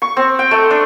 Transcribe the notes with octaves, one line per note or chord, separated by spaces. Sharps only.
C#6
C4
G5
A3
D4